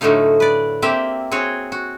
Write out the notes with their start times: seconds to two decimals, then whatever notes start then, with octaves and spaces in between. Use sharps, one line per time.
0.01 A2 D3 F#3 A3 D#4 F5
0.40 B4 D5
0.82 A#3 C4 G4 E5
1.32 C4 F#4 G#4 C#5
1.72 F#4